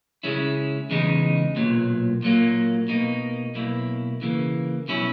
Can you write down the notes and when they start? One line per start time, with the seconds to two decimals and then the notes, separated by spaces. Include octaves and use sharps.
0.23 C#3 G#3 C#4 E4
0.90 E2 C#3 G#3 D#4
1.56 B1 A#2 F#3
2.22 A#2 F#3 A#3
2.88 B2 A#3 D#4
3.55 B1 B2 A#3 E4
4.21 C#3 E3 A#3
4.88 B2 F#3 C#4 E4